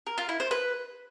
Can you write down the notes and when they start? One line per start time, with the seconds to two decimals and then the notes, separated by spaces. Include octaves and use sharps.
0.07 A#4
0.18 F4
0.29 E4
0.40 C5
0.51 B4